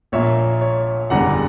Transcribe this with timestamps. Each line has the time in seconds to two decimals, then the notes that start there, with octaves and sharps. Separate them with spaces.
0.12 A#1 A#2 A#3 C#5 E5
0.61 C#5
1.10 F#1 E2 D3 G3 F#5 A#5